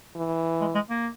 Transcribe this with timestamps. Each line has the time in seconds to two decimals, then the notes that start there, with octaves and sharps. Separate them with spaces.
0.16 E3
0.60 G#3
0.75 G#3
0.90 A#3